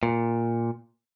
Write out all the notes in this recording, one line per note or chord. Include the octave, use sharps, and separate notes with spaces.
A#2